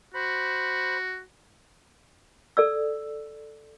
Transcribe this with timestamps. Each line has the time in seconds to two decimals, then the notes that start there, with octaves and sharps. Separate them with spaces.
0.14 F#4 C5 B5
2.57 A4 D5 E6